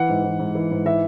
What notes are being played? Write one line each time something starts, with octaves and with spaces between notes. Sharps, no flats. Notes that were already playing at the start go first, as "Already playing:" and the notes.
Already playing: E3 F#5
G#2
E3
G#2
E3
G#2
E3 E5